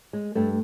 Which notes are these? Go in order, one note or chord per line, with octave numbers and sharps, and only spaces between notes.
G#3
G2 A3